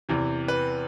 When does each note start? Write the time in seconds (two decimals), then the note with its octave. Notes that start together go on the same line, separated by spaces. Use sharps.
0.09 E2 C3 E3
0.48 B4